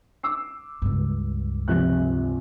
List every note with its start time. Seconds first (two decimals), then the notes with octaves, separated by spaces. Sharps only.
0.23 D6 E6 C7
0.82 C#2 G2
1.68 A#1 C3 F#6